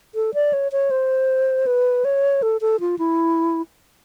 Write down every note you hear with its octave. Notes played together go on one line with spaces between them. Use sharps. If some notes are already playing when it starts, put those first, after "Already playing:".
A4
D5
C#5
C#5
C5
B4
C#5
A4
A4
F4
E4